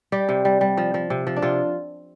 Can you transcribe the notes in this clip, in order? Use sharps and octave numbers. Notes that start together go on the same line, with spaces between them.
G3 G4
C3
G3
G3
F3
F3
C3
F3
D4
C3 F4